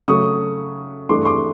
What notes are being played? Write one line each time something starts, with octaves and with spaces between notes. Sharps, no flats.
C#3 F#3 A3 C#6 D#6
G2 E3 A3 D4 C6 D6
C#6
C6 D6